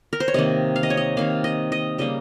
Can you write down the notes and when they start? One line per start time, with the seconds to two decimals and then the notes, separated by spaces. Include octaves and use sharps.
0.13 A#4
0.20 C5
0.28 C#5
0.34 C3 D#3 A#3 D#5
0.76 F5
0.83 D#5
0.90 C#5
0.97 D#5
1.17 C3 D#3 A#3 F5
1.44 D#5
1.72 D#5
1.98 C#3 G3 A#3 D#5